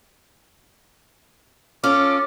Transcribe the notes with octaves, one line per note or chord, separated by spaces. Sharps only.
C#4 F4 A4 D6